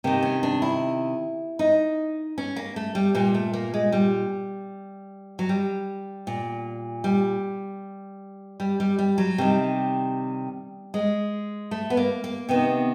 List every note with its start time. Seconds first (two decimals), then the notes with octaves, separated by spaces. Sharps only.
0.04 C3 D#3 A#3
0.22 C#4
0.43 D4
0.62 E4
1.59 D#4
2.38 C#4
2.56 A#3
2.76 A3
2.95 G3
3.15 A#2 G3
3.34 A3
3.54 A#3
3.74 G#3
3.92 G3
5.39 F#3
5.49 G3
6.27 A#2
7.04 G3
8.60 G3
8.80 G3
8.99 G3
9.18 F#3
9.38 C3 D#3 G3
10.94 G#3
11.71 A3
11.90 B3
11.97 A#3
12.24 A#3
12.49 C3 D#3 B3